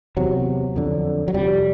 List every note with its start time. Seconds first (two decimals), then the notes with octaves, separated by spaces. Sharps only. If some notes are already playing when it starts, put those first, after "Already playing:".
0.17 E2 C3 F#3
0.76 F2 D3
1.28 F#3
1.34 F2 C3 G3